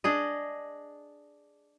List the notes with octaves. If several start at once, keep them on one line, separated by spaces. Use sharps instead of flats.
D4 G#4 D#5